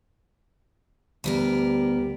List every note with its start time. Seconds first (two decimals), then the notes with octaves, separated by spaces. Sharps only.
1.24 D2 G3 B3 A#4